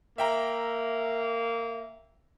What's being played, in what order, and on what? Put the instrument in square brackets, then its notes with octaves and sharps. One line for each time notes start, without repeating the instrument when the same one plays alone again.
[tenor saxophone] A#3 [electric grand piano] E5 G5 A#5